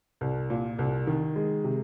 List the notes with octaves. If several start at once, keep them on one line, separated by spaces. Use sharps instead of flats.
C2
A#2
C2
D#3
G#3
C3